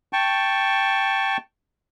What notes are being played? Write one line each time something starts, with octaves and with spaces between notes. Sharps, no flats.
G5 A5 C#6